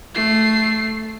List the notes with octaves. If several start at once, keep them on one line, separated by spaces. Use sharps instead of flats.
A3 C7